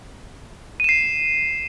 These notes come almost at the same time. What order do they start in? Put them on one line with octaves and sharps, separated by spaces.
D#7 E7 C7